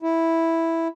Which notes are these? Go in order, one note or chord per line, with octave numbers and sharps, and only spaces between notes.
E4